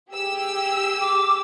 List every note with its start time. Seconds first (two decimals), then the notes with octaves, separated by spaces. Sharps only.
0.10 G4 G#4 E6
1.00 D6